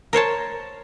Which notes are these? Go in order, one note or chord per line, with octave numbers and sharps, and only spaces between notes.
A#4 C5 C#5 A5